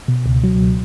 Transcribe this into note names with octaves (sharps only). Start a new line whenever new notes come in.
B2
C#2
F#3